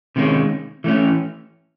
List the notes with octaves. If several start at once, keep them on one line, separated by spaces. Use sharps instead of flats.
C3 D#3 G#3 C#4
E3 A3 C#4